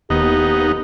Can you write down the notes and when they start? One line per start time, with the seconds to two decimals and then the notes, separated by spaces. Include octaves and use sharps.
0.10 D1 D#2 B3 D#4 G4